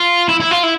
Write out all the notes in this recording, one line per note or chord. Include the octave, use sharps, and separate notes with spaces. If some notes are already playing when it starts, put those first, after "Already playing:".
Already playing: F4
E4
E4
F4
E4